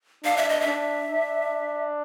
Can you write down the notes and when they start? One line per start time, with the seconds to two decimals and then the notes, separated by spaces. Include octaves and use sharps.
0.24 D4 F5
0.37 E5
0.49 D#5
0.60 E5
0.67 D4
1.11 D4